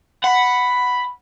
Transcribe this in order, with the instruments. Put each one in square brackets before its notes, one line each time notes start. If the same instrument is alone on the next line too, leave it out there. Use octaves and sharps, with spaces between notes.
[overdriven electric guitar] F#5 [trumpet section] B5